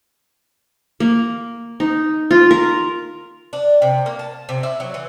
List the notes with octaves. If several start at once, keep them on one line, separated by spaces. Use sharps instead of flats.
A#3
D#4
F4
A#4
D4
C3
A#3
A5
C3
E4
F#3
E3